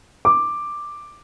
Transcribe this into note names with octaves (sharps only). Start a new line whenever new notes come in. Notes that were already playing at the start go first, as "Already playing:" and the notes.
D6